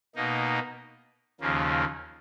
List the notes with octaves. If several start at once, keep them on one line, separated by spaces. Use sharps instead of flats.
B2 A#3 D#4
D#2 C#3 F3 A#3